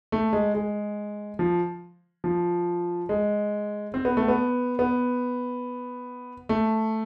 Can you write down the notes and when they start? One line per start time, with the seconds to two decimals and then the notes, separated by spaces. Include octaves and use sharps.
0.12 A3
0.33 G#3
0.54 G#3
1.39 F3
2.24 F3
3.09 G#3
3.94 C4
4.05 B3
4.17 A3
4.28 B3
4.79 B3
6.49 A3